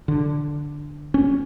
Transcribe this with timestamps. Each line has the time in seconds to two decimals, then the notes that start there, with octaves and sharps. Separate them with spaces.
0.08 D3
1.14 C#4